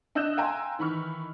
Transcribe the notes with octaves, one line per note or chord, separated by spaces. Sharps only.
D4 D#5 E6 F#6 G6 E7
F5 G5 G#5 A#5 C6 E6
D#3 E3 B5 C#6 F6